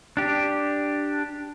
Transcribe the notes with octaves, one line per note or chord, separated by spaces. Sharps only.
D4 G4